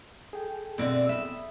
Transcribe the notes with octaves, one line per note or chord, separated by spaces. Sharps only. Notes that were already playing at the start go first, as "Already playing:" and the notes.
G#4 A4 G5
B2 D3 C4 E4 D5 E5
B3 E5